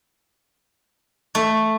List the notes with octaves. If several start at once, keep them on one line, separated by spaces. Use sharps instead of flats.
A3